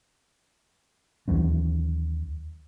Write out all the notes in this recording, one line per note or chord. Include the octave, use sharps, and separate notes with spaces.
D#2 E3 F#3 C#4